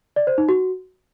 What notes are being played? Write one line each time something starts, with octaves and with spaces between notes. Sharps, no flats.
D5
C5
D#4
F#4